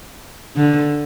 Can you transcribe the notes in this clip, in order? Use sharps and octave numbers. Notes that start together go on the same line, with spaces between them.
D3